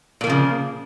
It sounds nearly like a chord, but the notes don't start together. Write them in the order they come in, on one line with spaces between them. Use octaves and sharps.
A#2 A#3 F3 C#3